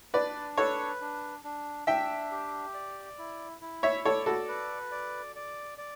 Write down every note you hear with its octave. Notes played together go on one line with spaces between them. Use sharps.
D4 B4 D5
A4 B4 C#5
D4
D4
D4 E5 G5
G4
D5
E4
E4
C#5 E5
A4 C#5 D5
F#4 A4
B4
D5
D5
D5